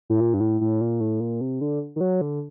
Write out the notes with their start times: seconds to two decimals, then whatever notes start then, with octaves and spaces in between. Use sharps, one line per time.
0.10 A2
0.20 A#2
0.34 G2
0.40 A2
0.61 A2
0.81 A#2
1.00 A2
1.20 A#2
1.41 C3
1.61 D3
1.96 D#3
2.01 F#3
2.21 D3